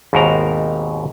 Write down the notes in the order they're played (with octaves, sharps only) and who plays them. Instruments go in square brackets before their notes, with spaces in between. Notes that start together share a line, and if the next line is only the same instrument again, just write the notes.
[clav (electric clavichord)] G#1 D#2 G#2 B2 A#4 A#5